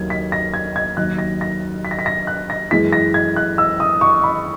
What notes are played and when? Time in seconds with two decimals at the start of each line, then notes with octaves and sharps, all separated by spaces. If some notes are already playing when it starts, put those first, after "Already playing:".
Already playing: D#2 D#3 F#3 G#6
0.10 B6
0.32 A#6
0.54 G#6
0.76 G#6
0.97 D#2 D#3 F#3 F#6
1.19 A#6
1.41 A#6
1.85 B6
1.91 A#6
1.99 B6
2.06 A#6
2.27 F#6
2.50 A#6
2.71 F#2 E3 G#3 B6
2.93 A#6
3.14 G#6
3.36 F#6
3.58 E6
3.80 D#6
4.01 C#6
4.24 B5